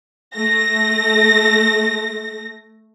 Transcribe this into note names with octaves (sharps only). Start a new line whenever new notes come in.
A3 A#6